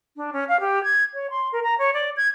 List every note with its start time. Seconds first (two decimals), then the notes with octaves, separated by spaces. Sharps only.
0.16 D4
0.32 C#4
0.48 F5
0.60 G4
0.83 G#6
1.13 C#5
1.30 C6
1.52 A#4
1.63 A#5
1.78 C#5
1.93 D5
2.16 G#6